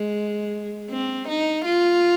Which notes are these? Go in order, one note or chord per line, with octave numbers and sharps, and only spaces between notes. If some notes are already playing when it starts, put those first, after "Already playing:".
Already playing: G#3
C4
D#4
F4